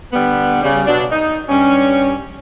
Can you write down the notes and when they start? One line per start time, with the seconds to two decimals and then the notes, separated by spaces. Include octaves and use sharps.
0.13 D3 G3 B3
0.63 C#3 G3
0.87 B2 F#3 D4
1.11 D#4
1.49 G2 G3 C#4